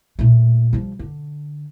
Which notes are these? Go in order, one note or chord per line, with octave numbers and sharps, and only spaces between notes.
A#2 A3
F3 G3
D3